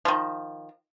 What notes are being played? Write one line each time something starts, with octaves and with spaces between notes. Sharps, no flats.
D#3 F3